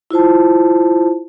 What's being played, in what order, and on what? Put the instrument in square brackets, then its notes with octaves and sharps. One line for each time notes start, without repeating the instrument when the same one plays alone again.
[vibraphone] E4 F4 C5 A5